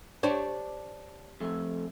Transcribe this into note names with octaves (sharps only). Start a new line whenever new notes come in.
D4 G4 C5 C#5
F2 A3